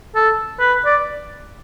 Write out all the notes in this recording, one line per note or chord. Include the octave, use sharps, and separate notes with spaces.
A4
B4
D5